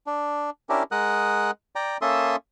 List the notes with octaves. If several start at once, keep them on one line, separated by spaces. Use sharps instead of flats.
D4
C#4 D4 E4 G4 A#4
G#3 A#4 F#5 D#6 F#6
D5 G5 A#5
A#3 C#4 A4 E5 C6 D#6